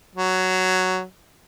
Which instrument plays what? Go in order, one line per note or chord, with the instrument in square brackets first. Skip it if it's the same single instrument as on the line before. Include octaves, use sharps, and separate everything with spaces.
[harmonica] F#3